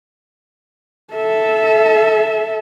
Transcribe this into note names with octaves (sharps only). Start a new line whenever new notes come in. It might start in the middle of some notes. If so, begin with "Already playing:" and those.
A4 E5